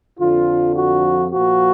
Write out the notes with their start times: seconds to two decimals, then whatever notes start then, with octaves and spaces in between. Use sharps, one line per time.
0.20 F2 D3 F3 F4
0.76 F#4
1.31 A#2 F3 F#4